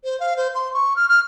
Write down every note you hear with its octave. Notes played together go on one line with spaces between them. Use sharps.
C5
F5
C5
C6
C#6
F6
F6